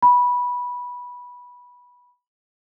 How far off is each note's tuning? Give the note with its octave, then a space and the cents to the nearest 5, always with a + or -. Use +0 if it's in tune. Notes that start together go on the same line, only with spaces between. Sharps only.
B5 -15